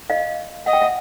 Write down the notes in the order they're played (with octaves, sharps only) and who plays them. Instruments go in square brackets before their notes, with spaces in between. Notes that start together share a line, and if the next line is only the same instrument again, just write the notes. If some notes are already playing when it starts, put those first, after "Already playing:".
[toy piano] D#5 F5
[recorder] D#5 [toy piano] F#5
[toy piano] G5
E5 F#5